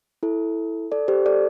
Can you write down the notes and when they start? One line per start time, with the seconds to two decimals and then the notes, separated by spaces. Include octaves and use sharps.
0.23 E4 A4
0.92 A4 D5
1.08 G4 C5
1.26 A4 D5